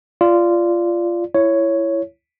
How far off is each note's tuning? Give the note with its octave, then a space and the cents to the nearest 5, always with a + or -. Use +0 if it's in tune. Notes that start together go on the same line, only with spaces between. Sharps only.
F4 -15 D5 -5
E4 +20 C#5 +0